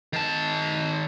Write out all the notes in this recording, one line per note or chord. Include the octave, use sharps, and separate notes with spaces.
D#3 A5